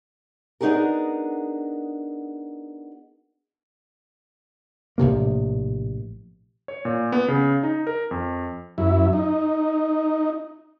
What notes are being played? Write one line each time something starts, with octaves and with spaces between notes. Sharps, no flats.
B3 D4 D#4 F#4 G#4 A#4
A#1 A2 C3 A#3
C#5
A#2
B3
C#3
D#4
A#4
F2
F#2 E4
D#4